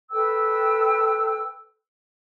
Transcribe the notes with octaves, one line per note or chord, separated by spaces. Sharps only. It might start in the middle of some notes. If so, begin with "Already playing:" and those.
A4 B4 G5 E6